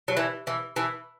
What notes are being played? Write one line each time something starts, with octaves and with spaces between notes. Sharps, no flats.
F#3
E3
E3
E3